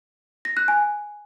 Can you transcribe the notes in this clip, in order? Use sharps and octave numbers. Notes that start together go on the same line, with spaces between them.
A#6
F#6
G#5